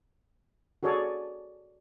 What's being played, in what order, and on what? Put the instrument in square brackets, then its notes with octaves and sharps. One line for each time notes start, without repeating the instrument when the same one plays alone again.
[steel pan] F#4 G#4 A4 C#5 D5